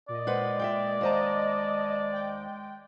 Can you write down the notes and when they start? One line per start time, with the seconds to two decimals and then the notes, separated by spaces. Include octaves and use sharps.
0.09 A#2 D5 D#5
0.27 G#3 B4 C5 F#5
0.59 E5 F5 G5
1.01 D#2 C5 D#5 A5 A#5
2.12 G5